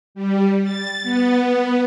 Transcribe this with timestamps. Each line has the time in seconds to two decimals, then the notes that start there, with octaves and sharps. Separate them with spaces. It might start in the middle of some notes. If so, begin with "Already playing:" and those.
0.15 G3
0.63 A6
1.03 B3